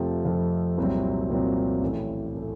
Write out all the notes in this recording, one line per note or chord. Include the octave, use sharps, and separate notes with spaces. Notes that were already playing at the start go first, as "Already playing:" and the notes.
Already playing: F2 C3 F3 A3
F2 C3 F3 A3
C2 A#2 F#3 C4
C2 A#2 F#3 C4
A1 A2 A3
A2 A3